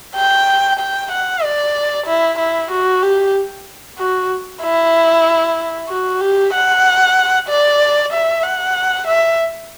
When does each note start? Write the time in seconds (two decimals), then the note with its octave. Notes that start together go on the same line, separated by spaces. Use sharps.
0.15 G5
0.79 G5
1.11 F#5
1.43 D5
2.07 E4
2.38 E4
2.71 F#4
3.02 G4
3.98 F#4
4.62 E4
5.89 F#4
6.21 G4
6.53 F#5
7.49 D5
8.12 E5
8.44 F#5
9.07 E5